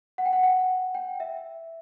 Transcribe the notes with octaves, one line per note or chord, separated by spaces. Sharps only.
F#5
G5
F#5
F#5
G5
E5